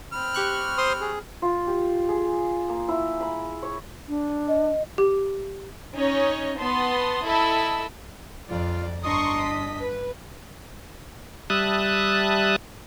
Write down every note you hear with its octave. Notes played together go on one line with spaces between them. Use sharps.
C4 B5 F6
G4 C#6 F#6
C5 C6 D#6
G#4
F4
G4
G#4
A#3
E4
B5
C#5
D4
D#5
G4
C#4 D#4 C#5 D#5
B3 A5 C6 D#6
E4 A4 D#5 B5 E6
F2 F4 D5
G1 D4 D#5 A#5 C6 C#6 D#6
B6
B4
G3 E5 A5 D#6 F#6